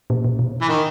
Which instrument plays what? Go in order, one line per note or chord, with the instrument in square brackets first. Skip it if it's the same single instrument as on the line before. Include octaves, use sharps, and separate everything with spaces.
[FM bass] A#2
A#2
B2
[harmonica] E3
D#3